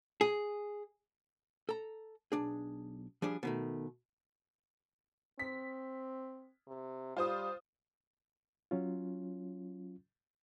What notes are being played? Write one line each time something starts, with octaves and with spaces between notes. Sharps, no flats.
G#4
A4 A#5
B1 D4 G#4
F3 G3 D4 G#4
B2 D#3 A3
C4 B6
C3
G3 F4 C5 D#6
F#3 C#4 F4